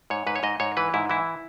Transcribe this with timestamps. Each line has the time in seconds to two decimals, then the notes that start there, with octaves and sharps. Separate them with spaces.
0.10 G#2 C#5
0.27 G#2 B4
0.36 C#5
0.43 G#2 D#5
0.60 G#2 C#5
0.77 E3 B4
0.94 G#2 E4
1.10 E3 E4